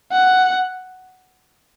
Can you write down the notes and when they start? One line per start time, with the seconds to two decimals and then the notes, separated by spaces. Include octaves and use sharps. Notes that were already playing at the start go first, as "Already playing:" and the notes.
0.11 F#5